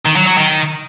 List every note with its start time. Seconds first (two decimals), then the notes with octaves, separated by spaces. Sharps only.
0.05 D#3
0.16 F#3
0.27 F#3
0.38 D#3